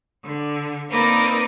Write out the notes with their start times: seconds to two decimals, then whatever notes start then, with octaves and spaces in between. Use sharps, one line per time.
0.25 D3
0.90 A#3 C4 D#4 A#4 B4 D5